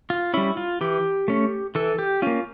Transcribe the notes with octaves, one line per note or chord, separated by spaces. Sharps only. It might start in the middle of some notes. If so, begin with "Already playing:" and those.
F4
G3 C#4 E4
F4
E3 G4
A3 C#4
E3 A4
G4
A#3 C#4 F4